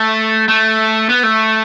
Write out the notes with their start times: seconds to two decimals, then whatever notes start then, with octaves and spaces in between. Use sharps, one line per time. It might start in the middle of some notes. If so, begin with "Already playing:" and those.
Already playing: A3
0.49 A3
1.09 B3
1.23 A3